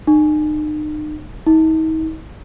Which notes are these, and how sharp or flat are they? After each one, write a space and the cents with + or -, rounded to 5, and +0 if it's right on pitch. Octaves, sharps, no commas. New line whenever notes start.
D#4 -40
D#4 +40